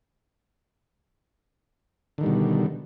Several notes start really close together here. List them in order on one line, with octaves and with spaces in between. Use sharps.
D3 D#3 G3 B2